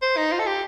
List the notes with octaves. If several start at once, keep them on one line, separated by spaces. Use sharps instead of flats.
C5
D#4
F4
A4
G4